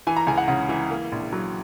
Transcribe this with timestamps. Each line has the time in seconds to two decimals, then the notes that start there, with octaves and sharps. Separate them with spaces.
0.07 E3 G#5
0.17 A#5
0.27 C#2 G#5
0.38 F#5
0.48 C#3 F#5
0.69 E3
0.90 A#3
1.12 A#1
1.33 F#3